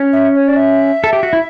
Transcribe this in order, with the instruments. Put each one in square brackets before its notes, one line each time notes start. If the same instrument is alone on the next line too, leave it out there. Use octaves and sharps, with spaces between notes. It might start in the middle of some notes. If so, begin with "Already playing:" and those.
Already playing: [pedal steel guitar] C#4
[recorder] E5
C#5
D5
E5
[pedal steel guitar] A4
G4
F#4
E4